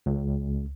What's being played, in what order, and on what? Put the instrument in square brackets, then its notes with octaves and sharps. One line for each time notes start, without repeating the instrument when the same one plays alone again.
[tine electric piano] C#2